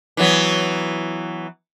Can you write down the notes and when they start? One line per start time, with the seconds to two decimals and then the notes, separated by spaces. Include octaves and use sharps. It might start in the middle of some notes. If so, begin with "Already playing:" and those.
0.17 E3 F#3 B3